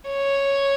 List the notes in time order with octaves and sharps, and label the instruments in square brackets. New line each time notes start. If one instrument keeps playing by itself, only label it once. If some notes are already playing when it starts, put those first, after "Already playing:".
[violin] C#5